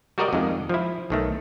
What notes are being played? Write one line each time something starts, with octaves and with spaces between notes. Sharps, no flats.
G3 F#4 A#4 D5 D#5
F2 D#3 G#3
F3 E4
B1 D#3 A3